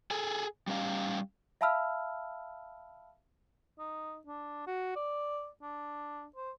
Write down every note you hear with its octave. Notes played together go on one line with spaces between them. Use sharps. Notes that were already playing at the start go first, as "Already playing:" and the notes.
G#4 A4 G#5
G3 C#4 F5
E5 F5 A5 B5 E6 F6
D#4
D4
F#4
D5
D4
C5